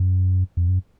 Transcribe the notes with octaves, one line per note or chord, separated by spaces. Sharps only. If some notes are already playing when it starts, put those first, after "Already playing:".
Already playing: F#2
F2
F#2